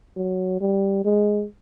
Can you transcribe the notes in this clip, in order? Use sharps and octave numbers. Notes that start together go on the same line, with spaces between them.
F#3
G3
G#3